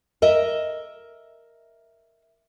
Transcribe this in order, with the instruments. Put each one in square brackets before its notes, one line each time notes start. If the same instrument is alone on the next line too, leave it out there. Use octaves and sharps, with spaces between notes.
[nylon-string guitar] A#4 D#5 E5